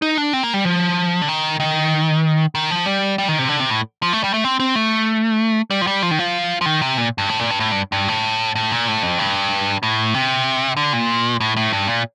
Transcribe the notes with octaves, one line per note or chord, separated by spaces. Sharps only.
D#4
D4
C4
A#3
G3
F3
D3
D#3
D#3
D#3
F3
G3
G3
D#3
C3
D3
C3
A2
F3
A3
G3
A3
C4
C4
A3
G3
F3
G3
F3
D#3
F3
F3
D#3
C3
A#2
G2
A2
A#2
G2
A2
G2
G2
A2
A2
A#2
A2
F2
G2
A2
C3
D3
A#2
A2
A2
G2
A#2